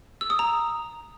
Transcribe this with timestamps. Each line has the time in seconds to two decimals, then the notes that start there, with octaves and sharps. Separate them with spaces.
0.21 E6
0.30 D#6
0.39 A#5